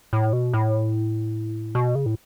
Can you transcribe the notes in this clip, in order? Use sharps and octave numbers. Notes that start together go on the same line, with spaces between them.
A2
B2
A2
B2
C#3
A2